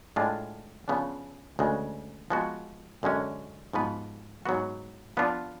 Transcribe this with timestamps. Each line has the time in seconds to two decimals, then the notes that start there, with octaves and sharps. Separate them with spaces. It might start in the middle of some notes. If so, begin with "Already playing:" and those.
0.16 A2 G#3 D4 F4
0.88 C#3 F3 B3 D4
1.59 D2 C#3 G#3
2.30 F3 G#3 B3 F#4
3.03 F#2 D3 G#3 C#4
3.73 G#2 F3 B3 F#4 B4
4.46 G#2 F#3 B3 F#4
5.17 F3 B3 D4 F4 B4